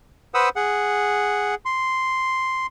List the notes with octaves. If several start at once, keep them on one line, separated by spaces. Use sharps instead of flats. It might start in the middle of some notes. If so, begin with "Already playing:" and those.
B4 C5 F#5 D#6 E6
G#4 F#5
C6